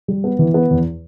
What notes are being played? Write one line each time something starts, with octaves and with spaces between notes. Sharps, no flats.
G3
B3
E3
B3
E2